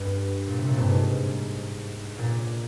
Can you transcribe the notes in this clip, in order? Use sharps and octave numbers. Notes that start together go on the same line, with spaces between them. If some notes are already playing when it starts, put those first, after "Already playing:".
Already playing: G2
A#2
C3
A#2
G2
G#2
A#2